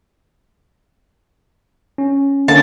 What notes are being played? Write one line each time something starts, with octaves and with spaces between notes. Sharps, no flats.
C#4
D3 A#3 C#4 A5